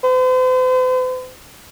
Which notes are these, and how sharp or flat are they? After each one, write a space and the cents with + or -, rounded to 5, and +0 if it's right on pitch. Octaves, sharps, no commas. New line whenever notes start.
C5 -45